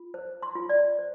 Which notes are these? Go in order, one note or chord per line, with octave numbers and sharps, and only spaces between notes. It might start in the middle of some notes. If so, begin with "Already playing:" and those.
Already playing: F4
C5
C6
F4
D5
C5